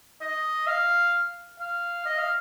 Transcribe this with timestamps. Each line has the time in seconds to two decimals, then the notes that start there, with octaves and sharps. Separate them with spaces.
0.21 D#5
0.67 F5
1.60 F5
2.05 D#5
2.18 F5